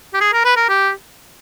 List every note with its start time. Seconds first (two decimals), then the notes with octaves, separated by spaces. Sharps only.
0.14 G4
0.21 G#4
0.33 A#4
0.44 B4
0.56 A#4
0.69 G4